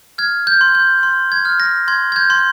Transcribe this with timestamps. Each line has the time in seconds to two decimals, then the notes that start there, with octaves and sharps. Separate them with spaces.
0.18 F6 G#6
0.47 G6
0.61 C6
0.75 G6
1.03 C6
1.32 G#6
1.45 F6
1.60 A#6
1.88 C6 G#6
2.12 G#6
2.16 G6
2.30 C6